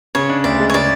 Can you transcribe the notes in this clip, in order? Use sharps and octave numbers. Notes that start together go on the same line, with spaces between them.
C#3 C#5
D4
D2 D5
G#3
C#5
C#3 D5